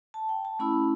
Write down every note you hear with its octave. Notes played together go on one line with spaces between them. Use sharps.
A5
G5
A5
A3 C#4 E4 B5